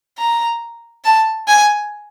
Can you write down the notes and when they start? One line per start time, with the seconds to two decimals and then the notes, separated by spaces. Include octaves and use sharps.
0.18 A#5
1.05 A5
1.48 G#5